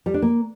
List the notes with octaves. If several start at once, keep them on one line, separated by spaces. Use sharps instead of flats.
G3
D4
A#3